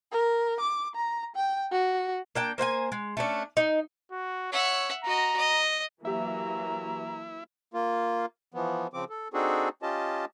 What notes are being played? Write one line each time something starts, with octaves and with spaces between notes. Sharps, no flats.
A#4
D6
A#5
G5
F#4
A#3 D4 G5
A#3 C5 G5 G#5
G#3
A3 C#4 D4
D#4
F#4
C#5 E5 F#5
F#4 D#5 A#5
D#5
E3 F#3 A#3 E4 G4 E5 A#5
A#3 F4
E3 F3 B3
C#3 F3 C4 D6
A4
C4 D4 D#4 F#4 G#4 A4
C#4 F4 G4 D#5 A5